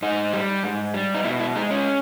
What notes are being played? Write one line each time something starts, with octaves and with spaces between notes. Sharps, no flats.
G#2 D#4
G3
G#2
G3
D#4
B2 E4
E4
G#3 D#4
C#4